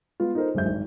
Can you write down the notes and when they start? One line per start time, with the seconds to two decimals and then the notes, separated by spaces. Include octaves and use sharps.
0.20 G#3 B3 F4
0.35 D#4 F4 A4 A#4 C5
0.54 G1 F#2 G#3 C5 E5 G6
0.66 G#1